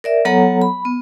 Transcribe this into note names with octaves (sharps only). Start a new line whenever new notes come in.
A#4 D5 E5
F#3 B3 A4 C#5 F#5 A#5
B5
B3